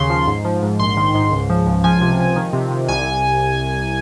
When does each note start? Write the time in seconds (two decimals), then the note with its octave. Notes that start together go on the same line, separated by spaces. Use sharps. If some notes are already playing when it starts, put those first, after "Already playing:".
Already playing: D#2 C#3 C6
0.10 F3
0.27 G#2
0.45 F3
0.63 G#2
0.79 A#1 C6
0.97 D#3
1.15 G#2
1.32 C#2
1.50 F3
1.66 C#2
1.84 F3 G#5
2.01 C3
2.19 F3
2.36 D#3
2.53 C3
2.71 C3
2.89 C2 G#5